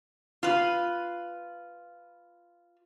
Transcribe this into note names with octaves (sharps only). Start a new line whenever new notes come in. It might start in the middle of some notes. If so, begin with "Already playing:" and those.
F4 B4